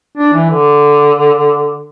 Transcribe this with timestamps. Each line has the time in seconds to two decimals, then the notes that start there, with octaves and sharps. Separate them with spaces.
0.17 D4
0.33 E3
0.50 D3